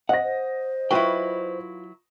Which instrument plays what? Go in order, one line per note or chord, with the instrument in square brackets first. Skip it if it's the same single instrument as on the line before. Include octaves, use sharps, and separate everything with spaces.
[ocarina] C5 [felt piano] D#5 A#6 [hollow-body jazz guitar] F#5
[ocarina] C5
[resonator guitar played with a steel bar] F#3 E4 [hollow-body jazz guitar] F4 B4 G5